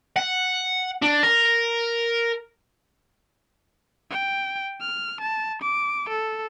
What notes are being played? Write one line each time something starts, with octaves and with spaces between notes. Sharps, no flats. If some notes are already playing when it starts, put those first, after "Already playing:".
F#5
D4
A#4
G5
F6
A5
D6
A4